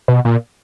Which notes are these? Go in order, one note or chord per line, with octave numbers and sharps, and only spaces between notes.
B2
A#2